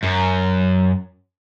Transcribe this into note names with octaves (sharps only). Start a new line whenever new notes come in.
F#2